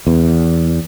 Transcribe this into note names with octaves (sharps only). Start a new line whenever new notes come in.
E2